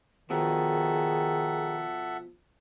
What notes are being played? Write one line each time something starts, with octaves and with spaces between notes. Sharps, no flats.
B2 D#3 F3 G#4 A4 E5 F#5